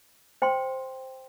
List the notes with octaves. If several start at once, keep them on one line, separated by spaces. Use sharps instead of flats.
C5 G5 C6